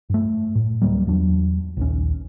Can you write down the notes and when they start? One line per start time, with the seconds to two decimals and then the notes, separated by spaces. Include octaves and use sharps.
0.10 G2 A3
0.55 A2
0.82 D2 F#3 G3 A#3
1.07 E2 F#3 D4
1.77 A#1 D#2 C#4